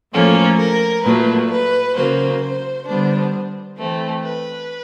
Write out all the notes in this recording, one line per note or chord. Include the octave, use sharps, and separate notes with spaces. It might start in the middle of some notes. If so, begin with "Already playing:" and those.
A2 F3 A#3 C#4 A4
A#4
A#2 F#3 A3 B4
B4
C#3 F#3 A#3 C5
C5
D3 G3 B3 D4 C5
E3 A3 C4
B4